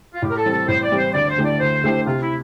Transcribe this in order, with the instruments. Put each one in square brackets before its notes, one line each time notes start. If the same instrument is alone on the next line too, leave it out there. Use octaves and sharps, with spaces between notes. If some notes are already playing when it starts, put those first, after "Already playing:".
[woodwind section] F4
[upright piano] A2 [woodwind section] G4
[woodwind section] A#4
A4
[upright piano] E3 G3 C4
[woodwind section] A4
[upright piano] A2 [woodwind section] C5
[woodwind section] D5
[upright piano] E3 G3 C4
[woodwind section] C5
[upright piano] D2 [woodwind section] D5
[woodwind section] C5
[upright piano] D3 A3 E4 G4
[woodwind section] D5
[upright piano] D2 [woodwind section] C5
[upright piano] D3 A3 E4 G4
[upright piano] C3 [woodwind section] F4
[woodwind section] E4